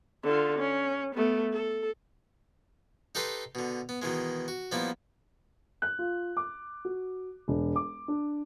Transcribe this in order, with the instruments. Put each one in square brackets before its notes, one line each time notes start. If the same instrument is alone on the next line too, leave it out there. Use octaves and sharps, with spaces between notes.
[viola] D3 F4
C#4
A3 B3
A4
[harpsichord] D#4 G4 A4 B4 C6
B2 D3
B3
B2 D#3 E3 G#3
F#4
F3 G3 A#3 B3 E4
[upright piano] F#6
F4
D6
F#4
E1
D6
D4